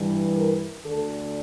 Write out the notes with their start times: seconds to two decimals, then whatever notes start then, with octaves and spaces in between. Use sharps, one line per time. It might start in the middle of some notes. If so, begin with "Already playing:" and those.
Already playing: G2 E3
0.37 A#4
0.85 D2 D3 A4